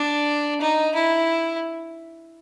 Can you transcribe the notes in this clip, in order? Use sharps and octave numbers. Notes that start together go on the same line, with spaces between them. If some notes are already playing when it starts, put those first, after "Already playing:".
Already playing: D4
D#4
E4